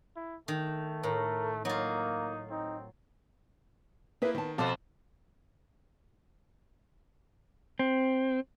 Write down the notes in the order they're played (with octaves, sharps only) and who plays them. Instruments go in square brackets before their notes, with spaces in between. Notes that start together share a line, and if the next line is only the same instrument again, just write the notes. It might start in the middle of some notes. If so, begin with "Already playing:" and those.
[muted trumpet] E4
[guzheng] D#3 [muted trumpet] A3
[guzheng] A2 [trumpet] A#4
[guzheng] F#3 F4 [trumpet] A#3 [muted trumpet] D#4
[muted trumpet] C4 [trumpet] D#4
[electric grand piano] A#3 E4 [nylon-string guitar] G#4 B4 E5
[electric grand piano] D#3 [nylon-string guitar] B3 A5
[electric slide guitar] F2 C5 [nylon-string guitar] B2 F#4 [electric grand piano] F5 A5 D6
[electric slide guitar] C4